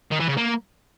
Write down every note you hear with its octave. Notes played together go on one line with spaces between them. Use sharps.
D#3
E3
C#3
A#3